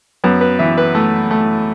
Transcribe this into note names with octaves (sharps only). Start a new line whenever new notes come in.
F#2 B3
B4
E3 E5
B4
A3
A3